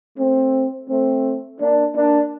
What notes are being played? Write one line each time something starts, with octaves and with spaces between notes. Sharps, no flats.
A3 C4
A3 C4
A#3 D4
A#3 D4